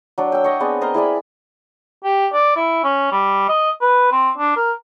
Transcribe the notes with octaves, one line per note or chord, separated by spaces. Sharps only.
F#3 D4
G5 E6
C#5 D#5
B3 C4 D4 G#4
A#4 C5 D#5
E4 G#4 D5 B5
G4
D5
E4
C#4
G3
D#5
B4
C4
D4
A#4